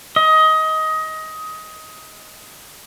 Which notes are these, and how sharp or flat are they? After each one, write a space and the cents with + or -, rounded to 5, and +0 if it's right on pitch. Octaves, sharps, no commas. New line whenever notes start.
D#5 +20